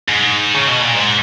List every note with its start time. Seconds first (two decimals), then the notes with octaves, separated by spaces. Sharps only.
0.09 G#2
0.54 C#3
0.67 B2
0.81 A#2
0.95 G#2